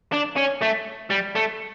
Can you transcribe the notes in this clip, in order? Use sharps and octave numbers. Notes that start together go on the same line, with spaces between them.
D4
C#4
A3
G3
A3